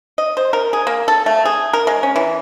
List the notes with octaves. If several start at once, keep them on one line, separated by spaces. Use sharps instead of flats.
D#5
C5
A#4
G#4
A#3
A4
A3
G#4
A#4
G#3
C#4
E3